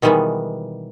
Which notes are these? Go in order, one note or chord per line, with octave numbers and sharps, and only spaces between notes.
B2 D#3 E3 G3 G#3 B3